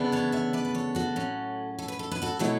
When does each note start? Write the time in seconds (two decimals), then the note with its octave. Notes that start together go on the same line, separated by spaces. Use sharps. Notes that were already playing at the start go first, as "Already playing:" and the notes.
Already playing: D2 C#3 E3 B3 D4
0.12 A4 C#5
0.32 C#5 E5
0.53 B4 D5
0.65 B4
0.75 A4 C#5
0.95 F#4 A4
1.16 A2 F#3 C#4
1.79 A4
1.88 B4
1.99 A4
2.11 B4
2.22 F#4 A4
2.39 B2 F#3 A3 E4 A4 C#5